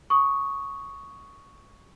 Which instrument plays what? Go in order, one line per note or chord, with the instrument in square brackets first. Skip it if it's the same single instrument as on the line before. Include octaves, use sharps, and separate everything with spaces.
[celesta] C#6 D#6